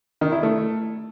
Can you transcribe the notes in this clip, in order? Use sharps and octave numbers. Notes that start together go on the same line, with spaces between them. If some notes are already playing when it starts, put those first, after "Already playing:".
D#3
E4
A3